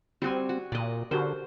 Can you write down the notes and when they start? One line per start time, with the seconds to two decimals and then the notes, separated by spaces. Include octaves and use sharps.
0.22 G3 C4 F#4 G#5
0.49 F#4
0.72 A#2 D5 D#5
1.11 D3 F#4 G4 A#4 C5